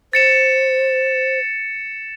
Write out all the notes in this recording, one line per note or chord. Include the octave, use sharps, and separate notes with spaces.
C5 A6 C#7 E7